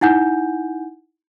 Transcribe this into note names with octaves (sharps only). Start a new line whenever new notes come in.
D#4 E4 F#5 G#5 G6